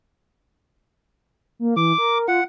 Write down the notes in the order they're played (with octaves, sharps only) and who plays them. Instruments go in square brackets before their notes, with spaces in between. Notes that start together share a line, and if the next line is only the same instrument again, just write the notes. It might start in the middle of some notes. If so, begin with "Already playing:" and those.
[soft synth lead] A#3
[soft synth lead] E3 [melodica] D6
[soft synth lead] A#4
[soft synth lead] F4 [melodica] F#5